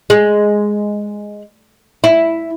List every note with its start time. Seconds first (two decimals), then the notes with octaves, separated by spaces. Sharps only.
0.10 G#3
2.04 E4